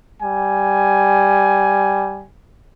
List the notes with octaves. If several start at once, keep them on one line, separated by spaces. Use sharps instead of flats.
G3 G#5